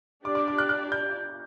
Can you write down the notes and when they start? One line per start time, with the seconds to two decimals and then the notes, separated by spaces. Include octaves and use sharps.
0.24 D4 G4 D5 D6
0.35 D6
0.48 D6
0.58 F#6
0.69 F#6
0.92 G6